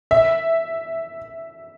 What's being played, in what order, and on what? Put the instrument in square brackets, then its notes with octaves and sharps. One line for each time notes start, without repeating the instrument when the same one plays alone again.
[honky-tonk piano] E5